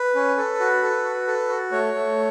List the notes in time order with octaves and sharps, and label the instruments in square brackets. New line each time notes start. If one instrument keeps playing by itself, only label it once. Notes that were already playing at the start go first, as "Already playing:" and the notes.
Already playing: [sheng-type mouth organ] B4
C#4
A4
F#4
A4
F#4
A4
F#4
A3 C#5
A3